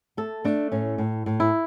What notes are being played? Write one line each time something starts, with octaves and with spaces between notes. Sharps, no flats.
A3 A4
A3 D4
A2 C#4
A2
A2
E4